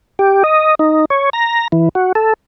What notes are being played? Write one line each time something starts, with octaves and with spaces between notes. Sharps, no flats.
G4
D#5
D#4
C#5
A#5
E3
F#4
A4